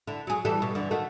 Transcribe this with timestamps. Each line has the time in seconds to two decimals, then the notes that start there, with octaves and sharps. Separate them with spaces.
0.07 D3 E4
0.27 F#3 G#4
0.45 E3 G3 A4
0.62 B2
0.75 G2 D3 E3
0.91 D#3 A3 F#4